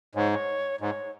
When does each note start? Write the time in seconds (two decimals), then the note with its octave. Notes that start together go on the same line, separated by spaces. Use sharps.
0.15 G#2 C#5
0.32 C#5
0.81 G#2 C#5